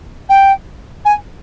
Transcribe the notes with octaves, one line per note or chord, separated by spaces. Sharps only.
G5
G#5